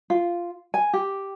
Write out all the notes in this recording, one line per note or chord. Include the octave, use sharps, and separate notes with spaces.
F4
G#5
G4